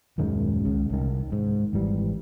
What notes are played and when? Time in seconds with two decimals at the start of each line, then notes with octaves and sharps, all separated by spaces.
0.18 D#1 F#2 D#3 G#3
0.65 C#2 C#3
0.89 C2 D#3
1.32 G#2
1.73 G#1 E3 G3